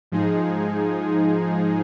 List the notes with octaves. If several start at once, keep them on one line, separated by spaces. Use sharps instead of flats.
G#2 F3 G#3 D#4 G#4